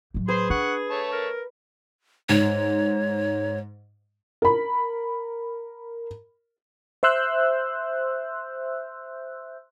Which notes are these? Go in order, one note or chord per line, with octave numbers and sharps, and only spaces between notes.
A2 F#3
G#4 B4 C5 C6
D4 F#5 C#6
A3 C#5 A5
A#4
G#2 C#5
A#4 B5
C5 E5 C6 E6 F#6 G6